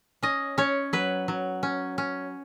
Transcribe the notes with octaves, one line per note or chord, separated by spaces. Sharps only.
C#4 D#5
C#4 C#5
F#3 B4
F#3
C#4
C#4